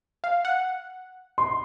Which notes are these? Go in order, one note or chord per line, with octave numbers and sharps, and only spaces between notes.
F5
F#5
C6